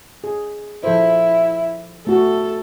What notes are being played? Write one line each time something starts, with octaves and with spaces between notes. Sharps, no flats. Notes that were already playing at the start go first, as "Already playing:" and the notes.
G#4
F3 E4 A4 C5
A3 F#4 A4